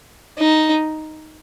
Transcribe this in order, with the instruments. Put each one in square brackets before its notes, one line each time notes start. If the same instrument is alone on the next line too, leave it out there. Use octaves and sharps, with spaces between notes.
[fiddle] D#4